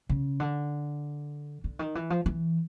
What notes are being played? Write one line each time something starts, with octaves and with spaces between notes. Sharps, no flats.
C#3
D3
D3
D#3
E3
F3
E3